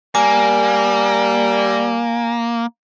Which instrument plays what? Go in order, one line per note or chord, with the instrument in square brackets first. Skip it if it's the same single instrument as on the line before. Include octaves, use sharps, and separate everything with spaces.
[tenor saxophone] G3 [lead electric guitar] A#3 [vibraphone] G#5